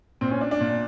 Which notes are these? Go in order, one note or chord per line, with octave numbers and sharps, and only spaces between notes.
A#2 C4
C#4
D4
D4
A#2